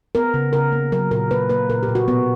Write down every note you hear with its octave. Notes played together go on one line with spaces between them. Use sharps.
B3 A#4
C#3
C#3 A#4
A#3
F#3 A#4
A#2 A#4
A#3 B4
A#3 B4
A#2 A#4
G4
A#2
F#4
B2 B3